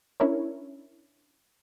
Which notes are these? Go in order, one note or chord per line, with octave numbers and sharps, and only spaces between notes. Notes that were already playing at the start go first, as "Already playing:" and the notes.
C#4 D4 E4 A#4 C#5